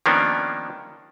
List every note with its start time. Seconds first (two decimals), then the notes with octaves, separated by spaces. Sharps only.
0.06 D#3 F3 A#3 B3 C#4 D4